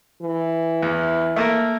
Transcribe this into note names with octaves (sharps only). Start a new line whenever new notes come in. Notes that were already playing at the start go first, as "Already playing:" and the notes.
E3
E2
A3 A#3 A#4